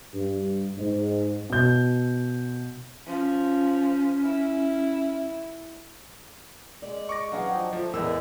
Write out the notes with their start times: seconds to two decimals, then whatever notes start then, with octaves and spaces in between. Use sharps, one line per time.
0.14 G2
0.78 G#2
1.50 B2 G6
3.07 F3 C#4
4.24 E4
6.82 G#3 D5
7.09 C#6 D6 A#6
7.32 E3 F#3 D4 G#4 F5
7.50 F3 D#5 G5
7.73 F3 A3
7.93 E2 A2 G#3 A#4 D5 E6